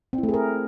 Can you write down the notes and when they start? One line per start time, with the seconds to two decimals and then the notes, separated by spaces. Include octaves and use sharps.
0.13 C4
0.18 E4
0.23 A3
0.29 G#4
0.34 A#4